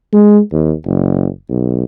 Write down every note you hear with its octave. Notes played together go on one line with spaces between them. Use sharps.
G#3
D#2
F#1
B1